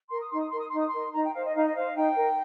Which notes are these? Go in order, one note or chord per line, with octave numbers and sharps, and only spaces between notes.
A#4 C6
D#6
D#4 C6
D#6
A#4 C6
D#6
D#4 C6
D#6
C6
A#4
D#4 A#5
G5
C5 F5
D#5
D#4 F5
D#5
C5 F5
D#4 G5
A#4